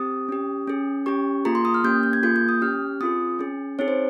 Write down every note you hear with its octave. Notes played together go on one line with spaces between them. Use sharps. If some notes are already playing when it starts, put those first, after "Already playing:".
Already playing: C4 G4 D#6
C#4 G4
C#4 G#4
C#4 G4 C#6
A#3 F4 G#4 A#5
C6
D#6
F6
A#3 C#4 G4 G6
G6
G#6
A#3 F4 G#4 G6
G6
D#6
C#4 G4 F6
C4 F4 G#4 D#6
C#4 G#4
C4 D#4 G#4 C#5
C5